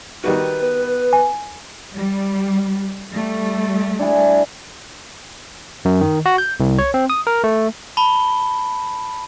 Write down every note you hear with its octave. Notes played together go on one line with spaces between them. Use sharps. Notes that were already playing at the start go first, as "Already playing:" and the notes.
D#3 G3 F#4 B4
B3
G#5
G3
G3 A3
D4 E4 G#4
F#2
D#3
F#4
G6
C2
C#5
C4
D#6
A#4
A3
A5 B5 G7